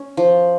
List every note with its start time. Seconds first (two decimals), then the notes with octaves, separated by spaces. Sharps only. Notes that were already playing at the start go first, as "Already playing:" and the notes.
Already playing: C#4
0.17 F3